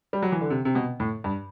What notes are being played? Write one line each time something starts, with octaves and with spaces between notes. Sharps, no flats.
G3
F#3
E3
D3
C3
C3
B2
A2
G2